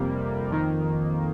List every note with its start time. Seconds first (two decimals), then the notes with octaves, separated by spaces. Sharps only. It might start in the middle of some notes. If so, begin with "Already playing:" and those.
Already playing: F2 C3 G3 A#3
0.51 F2 D#3 A#3